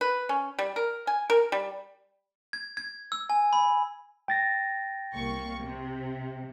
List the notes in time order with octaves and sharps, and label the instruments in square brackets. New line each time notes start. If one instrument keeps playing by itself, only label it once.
[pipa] B4
C#4
G3
A#4
G#5
A#4
G3
[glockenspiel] G#6
G#6
E6
G#5
B5
[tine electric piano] G5 A6 A#6
[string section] C2 A#3 C#6
C3